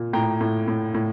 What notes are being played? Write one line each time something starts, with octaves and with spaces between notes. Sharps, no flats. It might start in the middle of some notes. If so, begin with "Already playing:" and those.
Already playing: A#2
A2 G5 A#5
A2
A2
A2